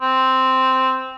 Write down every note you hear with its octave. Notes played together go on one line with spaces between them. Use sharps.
C4